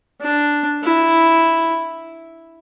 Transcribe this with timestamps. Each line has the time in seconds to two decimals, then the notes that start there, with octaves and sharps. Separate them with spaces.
0.21 D4
0.83 E4